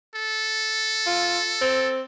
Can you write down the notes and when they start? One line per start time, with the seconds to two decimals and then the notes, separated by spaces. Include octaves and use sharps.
0.15 A4
1.06 F4
1.61 C4